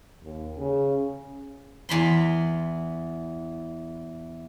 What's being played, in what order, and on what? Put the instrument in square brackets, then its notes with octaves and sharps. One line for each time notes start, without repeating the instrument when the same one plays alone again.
[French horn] D#2
C#3
[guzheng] E2 B5 C6